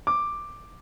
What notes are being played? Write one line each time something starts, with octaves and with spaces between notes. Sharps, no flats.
D6